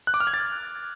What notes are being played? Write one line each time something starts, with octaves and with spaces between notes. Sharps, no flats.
F#6
D6
F6
G#6
A6